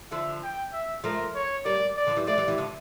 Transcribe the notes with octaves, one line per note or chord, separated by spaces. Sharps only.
D3 F3 E5
G5
E5
F3 A3 A#4
C#5
G3 A#3 D5
D5
D3 F3
E3 G3
F3 A3 D5
E3 G3
E3 G3
D3 F3